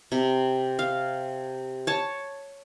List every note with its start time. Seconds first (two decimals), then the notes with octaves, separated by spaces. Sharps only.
0.12 C3
0.79 F5
1.87 C#5 A5